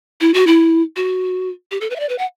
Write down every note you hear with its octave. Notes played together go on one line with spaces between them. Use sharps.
E4
F#4
E4
F#4
G4
A4
B4
E5
D5
B4
F#5